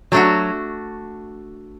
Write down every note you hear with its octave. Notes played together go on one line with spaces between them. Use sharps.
F#3 A3 D4 F#4